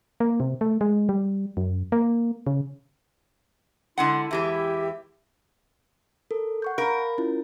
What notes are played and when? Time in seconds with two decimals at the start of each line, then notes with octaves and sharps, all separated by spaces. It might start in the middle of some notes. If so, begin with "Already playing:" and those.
0.20 A#3
0.40 C3
0.61 A3
0.81 G#3
1.09 G3
1.57 F#2
1.92 A#3
2.47 C#3
3.98 D3 G#3 E4 F#5 C6
4.31 E2 E3 G#3 G4 E5
6.31 A4 A#4
6.62 F#5 C#6 G6
6.78 A#4 F5 B5
7.18 C#4 E4 F4